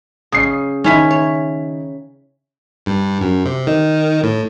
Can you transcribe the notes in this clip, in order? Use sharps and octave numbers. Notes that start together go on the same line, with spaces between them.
C#3 D#6 C7
D#3 C#4 E4 C#5 B6
C#5
G2
F#2
C3
D#3
A2